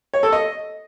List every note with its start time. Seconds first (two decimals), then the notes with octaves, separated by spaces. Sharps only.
0.14 C#5
0.23 A4
0.32 D#5